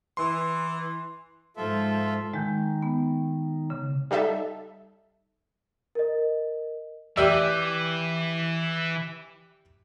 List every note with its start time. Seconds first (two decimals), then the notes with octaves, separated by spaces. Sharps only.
0.17 E3 C6
1.57 G#2 F3 F4 A4 E5
2.34 D#3 G#3 G6
2.83 B3
3.70 C#3
4.11 G3 D#4 A4 E5
5.95 A#4 D#5
7.17 E3 G4 D5 E5